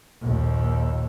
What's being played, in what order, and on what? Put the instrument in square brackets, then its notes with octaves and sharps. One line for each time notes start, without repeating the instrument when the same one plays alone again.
[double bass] A#1 D#2